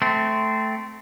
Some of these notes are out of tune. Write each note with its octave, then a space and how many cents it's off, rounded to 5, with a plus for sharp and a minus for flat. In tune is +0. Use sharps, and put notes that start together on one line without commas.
A3 +0 C4 -15